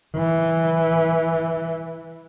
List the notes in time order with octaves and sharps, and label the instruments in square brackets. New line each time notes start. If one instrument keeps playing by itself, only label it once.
[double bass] E3